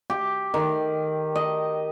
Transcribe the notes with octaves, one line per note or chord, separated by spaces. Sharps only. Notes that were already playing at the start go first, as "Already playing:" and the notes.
G4
D#3
D#5